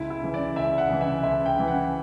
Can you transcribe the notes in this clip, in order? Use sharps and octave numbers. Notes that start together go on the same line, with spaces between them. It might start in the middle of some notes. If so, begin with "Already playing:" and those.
Already playing: C#2 E4
E4
C#3 E3
D5
C#2 E5
F#5
C#3 E3
E5
C#2 E5
G5
C#3 E3
F#5